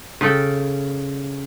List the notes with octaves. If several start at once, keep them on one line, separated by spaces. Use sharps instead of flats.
C#3 A4 G5